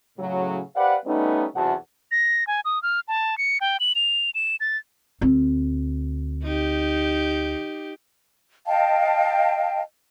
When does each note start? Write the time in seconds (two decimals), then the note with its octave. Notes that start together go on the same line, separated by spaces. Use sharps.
0.18 A2 C#3 F#3
0.75 G4 B4 C5 D5 F5 F#5
1.06 G3 A3 B3 C#4 D#4
1.55 B1 E2 C3 F#4 F#5 A5
2.11 A#6
2.47 G#5
2.65 D#6
2.83 F6
3.08 A5
3.38 C#7
3.61 G5
3.80 F#7
3.95 F7
4.35 E7
4.60 A6
5.21 D2 C4
6.43 D#4 G4
8.66 D#5 F5 G5 A5